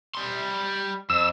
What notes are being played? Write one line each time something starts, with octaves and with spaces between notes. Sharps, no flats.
G3 C6
F2 E6